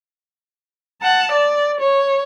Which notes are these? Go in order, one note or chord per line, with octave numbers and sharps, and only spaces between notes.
F#5 A5
D5
C#5